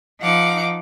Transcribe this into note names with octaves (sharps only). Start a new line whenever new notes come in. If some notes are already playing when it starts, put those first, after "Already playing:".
F3 D#4 F5 F#5 D6